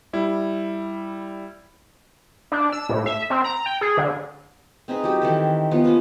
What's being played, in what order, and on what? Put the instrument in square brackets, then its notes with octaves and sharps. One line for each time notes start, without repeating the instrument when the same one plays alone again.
[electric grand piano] G3 E4
[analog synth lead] D4
E6
A2
E5
C4
A#5
G5
G#4
D3
[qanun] C4 D#4 G#4 B4
F#3 G4
D#3 E3 A4
F3 B3
A#3 C#4 F4 B4